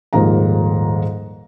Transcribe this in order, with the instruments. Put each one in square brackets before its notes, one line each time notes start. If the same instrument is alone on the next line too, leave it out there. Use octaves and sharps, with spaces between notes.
[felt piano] D#1 G#2 F3 A#3 A#5